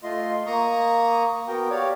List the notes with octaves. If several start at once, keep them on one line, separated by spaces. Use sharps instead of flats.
A3 F4 D#5 C6
A#3 A#5 C#6 D#6
B3 F#4 A#4 G5
G4 C#5 D5 F5